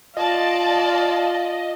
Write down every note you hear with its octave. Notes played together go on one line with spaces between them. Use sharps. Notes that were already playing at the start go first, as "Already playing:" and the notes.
F4 D5 D#5 A5